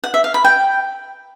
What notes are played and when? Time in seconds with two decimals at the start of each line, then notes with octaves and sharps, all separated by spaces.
0.04 F#5
0.14 E5
0.24 F5
0.34 B5
0.44 G5